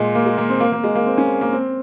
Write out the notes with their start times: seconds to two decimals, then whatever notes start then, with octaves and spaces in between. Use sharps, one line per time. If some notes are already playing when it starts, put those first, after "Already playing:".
Already playing: A#2 G#3
0.15 A#3
0.26 G#3
0.38 A#3
0.49 C4
0.60 A#3
0.72 A#3
0.84 G#3
0.95 A#3
1.06 C4
1.18 C#4
1.41 A#3
1.52 C4